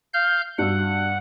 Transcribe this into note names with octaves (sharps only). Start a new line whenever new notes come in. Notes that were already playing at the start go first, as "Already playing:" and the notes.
F5 F6 G6
G2 F#4 F#5 E6